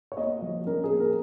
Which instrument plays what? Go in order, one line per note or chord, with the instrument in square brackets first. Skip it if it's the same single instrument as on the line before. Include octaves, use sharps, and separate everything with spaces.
[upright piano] C#5
A#3 D#5
F3
C#4 A#4
G#4
A#3
A#4